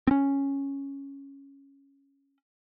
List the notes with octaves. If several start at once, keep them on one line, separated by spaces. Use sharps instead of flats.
C4 C#4